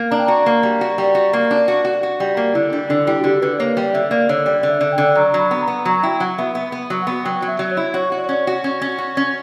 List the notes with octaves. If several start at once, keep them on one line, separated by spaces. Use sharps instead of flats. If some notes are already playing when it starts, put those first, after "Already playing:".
Already playing: A#3
D4 A#5
G5
F#4 A#5
A#3
G3
F#4
G3
F#4
A#3
D4
F#4
F#4
F#4
G3
A#3
D3 E4
G3 D4
D3 D4
G3 E4
F#4
D3 G4
D3 B4
A#3 C#5
G3 D5
D3 E5
A#3 D5
D3 C#5
G3 D5
D3 D5
E5
D3
G5
D3
F#3 A#5
F#3 B5
B3
A#5
B3
F#3 A#5
E4 G5
F#3 F#5
B3 E5
B3 E5
B3
F#3
B3 F#5
F#3 G5
F#3
E5
F#3
C#5
E4
F#4 C#5
F#4
D5
C#5
C#4 D5
C#5
F#4
C#4
C#4
F#4
C#4